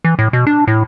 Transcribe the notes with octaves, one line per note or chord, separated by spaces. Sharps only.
E3
A2
B2
D4
A2